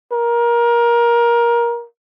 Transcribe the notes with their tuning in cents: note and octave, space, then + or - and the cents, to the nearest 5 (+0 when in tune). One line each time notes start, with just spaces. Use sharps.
A#4 +20